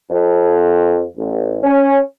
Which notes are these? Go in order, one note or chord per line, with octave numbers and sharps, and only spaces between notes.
F2
A1
C#4